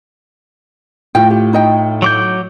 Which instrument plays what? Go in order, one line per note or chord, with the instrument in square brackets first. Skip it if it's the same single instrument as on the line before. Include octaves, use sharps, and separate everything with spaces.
[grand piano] A2 A3 F4 [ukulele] G5
[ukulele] G4
D#4 D#5 G5
[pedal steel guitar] F#3 D6 G6